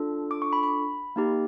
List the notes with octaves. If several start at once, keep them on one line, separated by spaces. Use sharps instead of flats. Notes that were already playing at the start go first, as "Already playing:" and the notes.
Already playing: D4 F4 A4
D6
C#6
B5
B5
A#3 D#4 G4